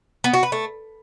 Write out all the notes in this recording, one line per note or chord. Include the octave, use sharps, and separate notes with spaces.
B3
F#4
B4
A3